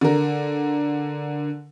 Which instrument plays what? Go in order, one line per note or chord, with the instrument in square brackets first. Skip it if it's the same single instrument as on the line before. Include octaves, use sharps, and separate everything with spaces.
[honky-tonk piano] D3 A#4